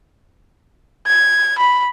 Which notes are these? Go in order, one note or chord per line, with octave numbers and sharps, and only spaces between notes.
G#6
B5